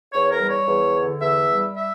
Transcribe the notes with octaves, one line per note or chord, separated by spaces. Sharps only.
E2 C#5
A#4
G3
C#5
E2
D3
E2 E5
G3
E5